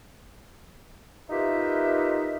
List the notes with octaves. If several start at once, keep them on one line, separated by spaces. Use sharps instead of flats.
D#4 F4 G4 A#4 B4 E5